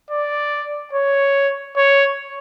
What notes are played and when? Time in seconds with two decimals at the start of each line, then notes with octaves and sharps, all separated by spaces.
0.11 D5
0.93 C#5
1.76 C#5